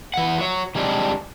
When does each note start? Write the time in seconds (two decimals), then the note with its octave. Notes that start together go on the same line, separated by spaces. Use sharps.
0.14 E3 F#5
0.38 F#4 C#5
0.75 D#3 G3 G#3 C4 D4